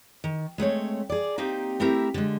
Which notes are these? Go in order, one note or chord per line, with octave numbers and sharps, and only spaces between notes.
D#3
G#3 A3 C4 C#5
G#4 D5
A#3 C4 D#4 G4
A3 C4 E4 G4 A#4 E5
D3 G#3